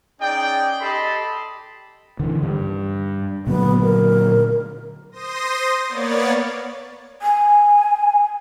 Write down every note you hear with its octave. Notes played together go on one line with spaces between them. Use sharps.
C#4 D#4 G#4 D5 G5
G4 A4 D#5 A5 B5 C6
D3 E3
G2
A#2 D3 F#3 B3
A#4
C5 C6 D#6 A#6
A#3 B3 C#5 D5 A6
G#5